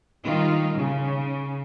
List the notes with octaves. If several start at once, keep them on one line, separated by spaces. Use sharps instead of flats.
D#3 G3 D#4 F4
C#3